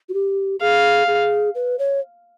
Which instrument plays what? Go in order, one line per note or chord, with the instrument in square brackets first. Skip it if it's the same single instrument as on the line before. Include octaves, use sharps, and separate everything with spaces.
[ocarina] F#4
G4
[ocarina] G#4 [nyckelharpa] F5
[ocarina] G#4
B4
C#5